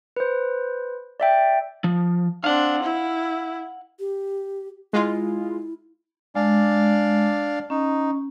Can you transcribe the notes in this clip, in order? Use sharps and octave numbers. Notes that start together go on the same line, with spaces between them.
B4 C5
D5 E5 G5
F3
C4 D4 F5 F#5
E4
G4
G#3 E4 F4
G#3 D4 D5 F5
C#4 D#4